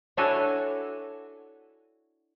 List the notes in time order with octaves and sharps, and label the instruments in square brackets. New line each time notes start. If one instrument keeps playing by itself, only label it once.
[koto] D4 E4 F#4 A4 C#5 G#5